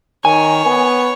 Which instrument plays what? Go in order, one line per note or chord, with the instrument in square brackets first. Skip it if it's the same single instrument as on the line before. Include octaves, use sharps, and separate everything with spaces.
[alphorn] D#3 [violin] C#5 [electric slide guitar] G#5
[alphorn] B3